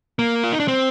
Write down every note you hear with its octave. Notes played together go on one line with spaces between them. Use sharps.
A#3
F4
D#4
D4
C4